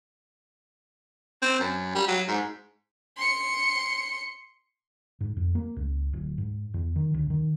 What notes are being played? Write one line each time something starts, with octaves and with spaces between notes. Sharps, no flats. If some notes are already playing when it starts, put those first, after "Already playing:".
C4
F#2
G3
F#3
G#2
C6 C#7
G#2
F2
A#3
C#2
D1
G#2
E2
D#3
D2
D#3